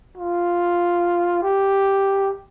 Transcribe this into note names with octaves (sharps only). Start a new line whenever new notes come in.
F4
G4